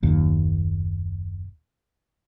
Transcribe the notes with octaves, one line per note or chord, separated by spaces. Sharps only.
F#1 D#2 A#2